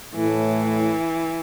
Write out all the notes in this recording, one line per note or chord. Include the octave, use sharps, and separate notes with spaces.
A2 E3